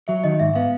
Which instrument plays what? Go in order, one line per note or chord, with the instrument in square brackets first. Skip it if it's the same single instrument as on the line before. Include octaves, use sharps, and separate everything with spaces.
[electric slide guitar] F#3 [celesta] E5
[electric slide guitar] D#3 [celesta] D#5
[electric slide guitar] G#2 [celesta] E5
[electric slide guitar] B3 [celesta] F5